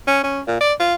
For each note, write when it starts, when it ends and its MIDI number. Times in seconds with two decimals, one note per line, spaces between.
0.07 0.22 61
0.24 0.41 61
0.47 0.59 46
0.61 0.73 74
0.80 0.95 65